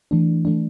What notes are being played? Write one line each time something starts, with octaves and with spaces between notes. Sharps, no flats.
E3 A3 D4
E3 A3 D4